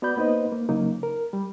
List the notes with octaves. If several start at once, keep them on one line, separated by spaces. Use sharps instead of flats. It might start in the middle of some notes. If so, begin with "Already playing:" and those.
B3 F#4 D5 B5 G6
A#3 B3 D#4 B4 C5 D#5
A#3
C#3 F#3 A#3 D#4
A#4
G3